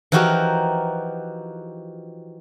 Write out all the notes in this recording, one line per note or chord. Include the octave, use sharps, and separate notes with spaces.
E3 F3 D#4 F#4 G4 A#4